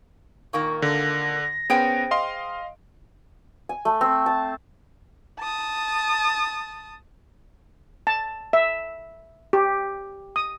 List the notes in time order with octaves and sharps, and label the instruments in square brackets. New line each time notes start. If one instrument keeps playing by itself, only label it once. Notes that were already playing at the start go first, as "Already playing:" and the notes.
[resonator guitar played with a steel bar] A#2 D#3 A#3 [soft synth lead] C#6
[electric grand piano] D3 [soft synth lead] A#6
[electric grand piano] B3 C#4 D7 [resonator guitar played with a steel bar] G#4 C5 G5
[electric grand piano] D#5 F5 C6
[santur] G#5
A3
C4
A5
[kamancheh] A5 D#6
[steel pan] A5
E5
G4
D#6